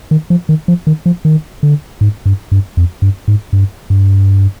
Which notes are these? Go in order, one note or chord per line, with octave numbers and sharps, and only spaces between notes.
D#3
F3
D#3
F3
D#3
F3
D#3
D3
G#2
G2
G2
F2
G2
G#2
G2
G2